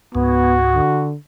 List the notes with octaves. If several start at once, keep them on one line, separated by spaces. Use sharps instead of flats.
C#2 G#2 B3 F#4
D3